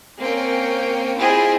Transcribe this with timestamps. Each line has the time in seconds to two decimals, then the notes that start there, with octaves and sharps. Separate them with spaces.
0.17 A#3 C4 C#4 G5
1.17 C4 E4 F4 G#4 D#5 G5